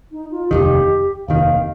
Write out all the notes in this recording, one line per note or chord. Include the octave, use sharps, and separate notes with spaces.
D#4
F4
F1 D#2 D#3 G4
F1 D#2 D#3 F5